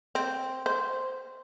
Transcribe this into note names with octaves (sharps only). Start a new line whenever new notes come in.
C4
C5